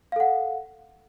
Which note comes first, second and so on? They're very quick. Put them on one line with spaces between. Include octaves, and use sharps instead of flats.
F5 A4 F#5